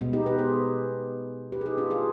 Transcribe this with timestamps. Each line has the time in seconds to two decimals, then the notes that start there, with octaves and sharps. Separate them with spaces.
0.01 B2 G#3 B3
0.13 D#4 G4
0.26 G4 B4
0.38 G#4 C5
1.52 G4 B4
1.61 G#4
1.66 D#4 G4
1.78 D4 F4
1.90 F4 G#4